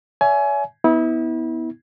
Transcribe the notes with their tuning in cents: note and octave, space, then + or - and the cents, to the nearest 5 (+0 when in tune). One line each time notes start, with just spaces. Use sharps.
C#5 +40 E5 +15 G#5 +25
B3 +0 E4 -30